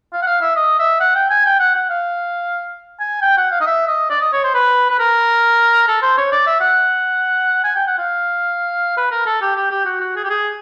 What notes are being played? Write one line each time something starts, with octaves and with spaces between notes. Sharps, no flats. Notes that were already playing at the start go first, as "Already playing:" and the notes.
F5
F#5
F5
E5
D#5
E5
F#5
G5
G#5
G5
F#5
F#5
F5
G#5
G5
F#5
F5
D#5
E5
D#5
D5
D#5
C#5
C5
B4
B4
A#4
A4
C5
C#5
D5
E5
F#5
G#5
G5
F#5
F5
B4
A#4
A4
G4
G4
G4
F#4
F#4
G#4
G4
G#4